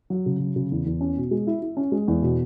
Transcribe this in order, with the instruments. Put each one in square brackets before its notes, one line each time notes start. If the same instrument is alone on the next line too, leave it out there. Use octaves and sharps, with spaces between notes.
[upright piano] F#3
C#3
F#3
C#3
E2
E2
C#4
B2
G#3
E4
E4
C#4
G#3
E2
B2